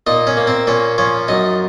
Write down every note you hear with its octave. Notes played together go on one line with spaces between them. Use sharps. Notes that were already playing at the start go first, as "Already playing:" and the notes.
A#2 D#4 D#5
C#4 C#5
A#3
C4 C5
A#2 C#4 C#5
F3 C#4 C#5
F#2 D#4 D#5